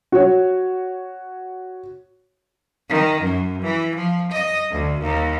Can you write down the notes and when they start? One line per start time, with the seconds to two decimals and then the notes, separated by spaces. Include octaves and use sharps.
0.12 F#4 C#5
2.89 D#3
3.21 F#2
3.62 E3
3.95 F3
4.32 D#5
4.71 D2
5.00 D#2